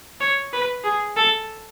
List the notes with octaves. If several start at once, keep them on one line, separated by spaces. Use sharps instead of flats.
C#5
B4
G#4
A4